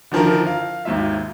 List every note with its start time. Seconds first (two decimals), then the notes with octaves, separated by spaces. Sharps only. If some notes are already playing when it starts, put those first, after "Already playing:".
0.12 D3 D#3 F3 E4 A#4
0.47 F5
0.85 G#1 D#2 G#2 F4 E5